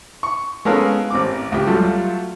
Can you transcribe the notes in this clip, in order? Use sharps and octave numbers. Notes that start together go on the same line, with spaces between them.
C#6
G#3 B3 C#4 A4 A#4 F5
A1 C4 D6
C#2 G4
F#3 G3 A3 F4